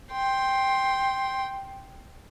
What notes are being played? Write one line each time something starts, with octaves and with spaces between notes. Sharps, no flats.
G5 C6